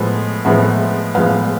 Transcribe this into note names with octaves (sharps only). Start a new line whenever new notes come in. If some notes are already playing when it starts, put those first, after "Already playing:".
Already playing: A2 F3 G#3 B3 D#5
A2 F3 G#3 B3 E5 F#5
A2 F3 G#3 B3 D#5 F5